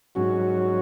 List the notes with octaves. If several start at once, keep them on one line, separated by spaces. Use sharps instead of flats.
G#2 F#3 C#4 F#4